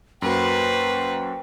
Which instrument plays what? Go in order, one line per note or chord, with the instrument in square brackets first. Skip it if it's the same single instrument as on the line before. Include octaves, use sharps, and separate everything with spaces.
[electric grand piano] F#2 A#3 F#4 [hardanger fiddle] B4 C5 [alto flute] G5